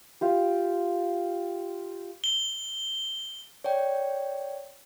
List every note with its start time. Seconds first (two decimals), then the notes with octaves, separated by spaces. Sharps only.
0.21 F4 G4
2.24 G7
3.64 C#5 D5 G5